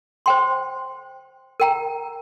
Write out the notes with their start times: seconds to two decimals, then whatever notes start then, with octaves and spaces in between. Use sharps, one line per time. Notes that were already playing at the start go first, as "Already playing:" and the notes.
0.26 C5 G5 C6
1.60 A#4 G5 A#5